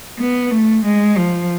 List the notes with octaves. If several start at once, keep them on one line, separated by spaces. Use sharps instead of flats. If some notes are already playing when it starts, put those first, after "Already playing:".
B3
A3
G#3
F3